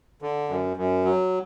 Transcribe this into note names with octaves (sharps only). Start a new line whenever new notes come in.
D3
F#2
F#2
F#3